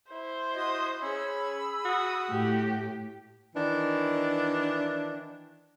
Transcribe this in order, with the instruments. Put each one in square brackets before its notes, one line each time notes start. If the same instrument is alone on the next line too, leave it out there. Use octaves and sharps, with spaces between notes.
[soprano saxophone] E4 [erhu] C5
[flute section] F#4 D#5 D#6
[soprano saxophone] C#4 [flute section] G#4 B5 E6
[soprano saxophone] F#4 [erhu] D#6
[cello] A2 [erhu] G4
[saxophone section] D#3 E3 D4